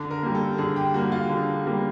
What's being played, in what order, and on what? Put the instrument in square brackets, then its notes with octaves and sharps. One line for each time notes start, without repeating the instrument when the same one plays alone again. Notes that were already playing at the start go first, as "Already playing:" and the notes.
Already playing: [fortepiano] D3
[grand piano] A#4
[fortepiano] G3 A#3
[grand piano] A4
[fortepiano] D3 [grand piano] G#4
[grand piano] G4
[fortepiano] G3 A#3 [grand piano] F#4
[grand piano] F4
[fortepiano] D3
G3 A#3